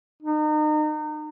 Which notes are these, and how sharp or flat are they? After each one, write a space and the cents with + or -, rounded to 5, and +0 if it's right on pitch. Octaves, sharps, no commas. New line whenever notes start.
D#4 -35